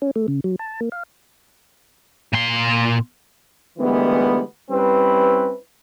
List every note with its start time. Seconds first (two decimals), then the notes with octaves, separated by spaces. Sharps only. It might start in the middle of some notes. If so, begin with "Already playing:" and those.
0.02 C#4
0.16 A3
0.28 C#3
0.44 F#3
0.59 A5
0.81 A#3
0.92 F5
2.33 A#2 C6
3.79 D2 D#3 E3 G3 G#3 B3
4.71 G3 C4 C#4 E4 B4